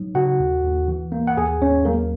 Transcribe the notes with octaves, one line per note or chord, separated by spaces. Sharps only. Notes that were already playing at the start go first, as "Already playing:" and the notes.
Already playing: F#3 D#4
C#3 F#4 F#5
D#2
D#2
E3
A#3
F#5
D#2 G#4 G#5
D#2 C#4 C#5
F#3 A#3 A#4